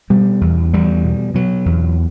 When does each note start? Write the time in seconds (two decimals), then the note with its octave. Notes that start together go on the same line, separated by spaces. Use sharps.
0.10 B2 G3
0.41 E2
0.73 E2 G3
1.04 B2
1.34 B2 F#3
1.66 E2